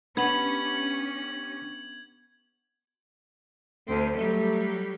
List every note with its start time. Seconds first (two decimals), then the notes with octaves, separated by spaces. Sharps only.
0.17 B3 C#4 D4 G4 G#6 F#7
3.87 D2 A3 C4
4.16 F#3 G3 A3